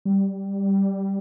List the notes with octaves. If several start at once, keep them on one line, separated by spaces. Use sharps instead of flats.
G3